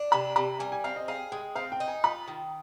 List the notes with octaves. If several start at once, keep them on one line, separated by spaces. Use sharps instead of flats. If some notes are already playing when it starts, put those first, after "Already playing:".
Already playing: D4
C3 B5
C3 B5
G3 G#5
G#5
C4 F5
D#5
G#4 F5
G#3 G5
C4 F5
G5
D#4
G#5
F4 B5
D#3